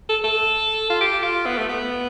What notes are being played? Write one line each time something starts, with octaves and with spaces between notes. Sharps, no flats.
A4
A4
F4
G4
F4
B3
A3
B3